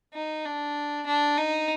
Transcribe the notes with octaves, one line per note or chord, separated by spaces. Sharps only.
D#4
D4
D4
D#4